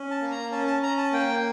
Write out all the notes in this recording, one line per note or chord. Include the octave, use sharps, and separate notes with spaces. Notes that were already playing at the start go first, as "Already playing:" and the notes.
Already playing: C#4
A5
A#3
A#5
C#4 A5
A5
C#4 A#5
A5
A#3 G5